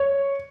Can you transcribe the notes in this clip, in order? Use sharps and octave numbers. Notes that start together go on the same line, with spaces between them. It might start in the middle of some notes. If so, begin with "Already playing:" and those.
Already playing: C#5